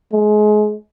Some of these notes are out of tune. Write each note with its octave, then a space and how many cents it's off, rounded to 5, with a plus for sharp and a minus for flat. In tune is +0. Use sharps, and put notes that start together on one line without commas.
G#3 +30